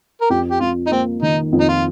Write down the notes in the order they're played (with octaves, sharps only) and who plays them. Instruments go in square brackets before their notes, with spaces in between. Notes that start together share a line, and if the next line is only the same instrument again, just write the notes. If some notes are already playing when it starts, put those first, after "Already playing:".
[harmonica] A#4
[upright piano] F2 [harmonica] G4
[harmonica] G4
[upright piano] F2 [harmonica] F4
[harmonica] D#4
[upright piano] A#3 [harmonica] C4
[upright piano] D#3 [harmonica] D#4
[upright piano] F2
[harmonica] D#4
F4